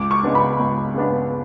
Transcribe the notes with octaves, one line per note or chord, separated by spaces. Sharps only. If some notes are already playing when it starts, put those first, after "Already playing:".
Already playing: C#2 D6
C#6
C#3 G#3 B3 D4
B5
C#2
C#3 G#3 B3 D4